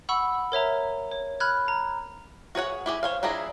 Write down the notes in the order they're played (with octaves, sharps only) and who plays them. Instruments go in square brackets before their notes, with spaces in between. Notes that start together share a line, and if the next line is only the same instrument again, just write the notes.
[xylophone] F#5 B5 C#6 E6
A#4 C#5 E5 A#5
C#5
B5 F6 F#6 G#6
A#5
[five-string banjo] F#4 G#4 C#5 F#5
E4 G4 G#4
C5 C#5 F5
F3 D4 E4 G#4 A#5